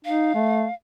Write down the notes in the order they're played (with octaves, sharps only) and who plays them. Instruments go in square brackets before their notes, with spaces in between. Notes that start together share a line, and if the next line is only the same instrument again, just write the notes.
[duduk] D#4 [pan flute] F5
[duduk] A3